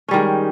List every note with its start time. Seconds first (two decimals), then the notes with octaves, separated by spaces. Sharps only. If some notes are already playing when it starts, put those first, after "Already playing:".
0.08 C#4
0.11 G3
0.14 D#3
0.16 G#3